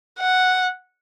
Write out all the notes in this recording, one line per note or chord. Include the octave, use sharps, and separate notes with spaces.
F#5